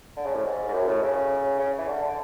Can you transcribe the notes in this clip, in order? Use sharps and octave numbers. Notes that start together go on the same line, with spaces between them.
D3
C#3
A2
G#2
G#2
F#2
A2
C#3
C#3
E3
D3
D3